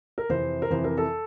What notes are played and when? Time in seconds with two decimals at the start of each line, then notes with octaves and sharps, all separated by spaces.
0.18 A#4
0.29 F2 C3 E3 C5
0.62 A#4
0.70 F2 C3 E3 C5
0.84 A#4
0.98 A4